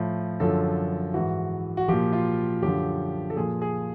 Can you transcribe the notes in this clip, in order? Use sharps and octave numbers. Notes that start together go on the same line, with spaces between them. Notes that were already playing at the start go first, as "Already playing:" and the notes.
Already playing: A2 F3
F#2 D3 F3 A4
G#2 E3 F#4
F#4
A#2 F3 G4
F4
F#2 D3 F3 G4
A4
A#2 F3 G#4
G#4